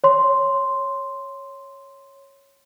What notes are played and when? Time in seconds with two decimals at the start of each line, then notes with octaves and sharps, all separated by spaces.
0.04 C#5 C6